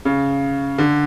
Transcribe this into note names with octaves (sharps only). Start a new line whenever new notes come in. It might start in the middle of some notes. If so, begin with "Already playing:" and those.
C#3
D3